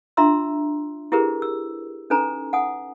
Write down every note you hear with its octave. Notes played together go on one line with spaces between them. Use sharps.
D4 F4 E5 A#5 C6 E6
E4 G4 G#4 A#4 B4
E6
C#4 D#4 A4 B4 G#5 A#5
F#5 G#5 D#6